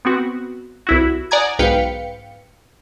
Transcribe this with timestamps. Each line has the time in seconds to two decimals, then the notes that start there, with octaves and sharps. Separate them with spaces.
0.05 B3 C4 F#4
0.87 C2 E4 F#4
1.31 D5 F#5 G#5 A#5 D#6 G#6
1.59 B1 G#2 B4 F5 G5 C#7